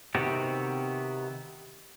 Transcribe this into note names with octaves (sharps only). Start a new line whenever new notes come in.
C3 D#3 B3 C4 F#4 G4